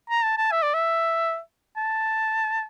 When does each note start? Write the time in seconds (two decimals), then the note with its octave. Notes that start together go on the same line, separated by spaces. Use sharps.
0.10 A#5
0.24 A5
0.37 A5
0.52 E5
0.62 D5
0.74 E5
1.77 A5